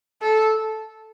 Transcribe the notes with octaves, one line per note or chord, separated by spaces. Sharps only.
A4